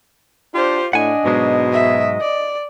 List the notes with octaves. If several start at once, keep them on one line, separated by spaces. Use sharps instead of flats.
D4 F4 G4 C5
A2 D4 D#5 F#5 G#5
G#2 B2 F#3 G#3
E5
D5